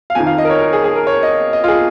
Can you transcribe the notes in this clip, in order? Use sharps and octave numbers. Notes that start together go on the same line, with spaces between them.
F5
F2 D#3 G#5
F5
D#5
A#4
C#5
A#4
G#4
G#4
A#4
C#5
D#5
D#5
F4
G#4